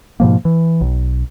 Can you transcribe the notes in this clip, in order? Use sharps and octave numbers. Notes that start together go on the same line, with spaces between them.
G#2 B2 F3 A#3
E3
B1